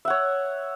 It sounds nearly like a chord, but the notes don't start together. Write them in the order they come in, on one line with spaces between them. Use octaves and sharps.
E5 F#5 C#5